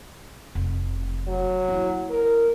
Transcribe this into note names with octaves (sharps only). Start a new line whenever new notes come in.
F1
F#3
A#3 E4
A#4